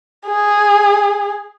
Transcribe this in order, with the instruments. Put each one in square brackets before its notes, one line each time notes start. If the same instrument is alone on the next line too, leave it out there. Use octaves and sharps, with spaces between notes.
[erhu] G#4